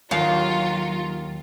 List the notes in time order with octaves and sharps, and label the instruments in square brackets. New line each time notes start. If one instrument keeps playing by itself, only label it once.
[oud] D#2 F5 [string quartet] F#3 F4